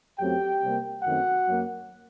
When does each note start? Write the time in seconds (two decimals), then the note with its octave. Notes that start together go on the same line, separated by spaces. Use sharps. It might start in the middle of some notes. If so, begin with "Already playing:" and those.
0.19 F#2 F#3 A3 C4 G4 G5
0.61 C3 G3 A#3
1.03 F#2 D#3 A3 C4 F#4 F#5
1.45 F#2 F#3 A#3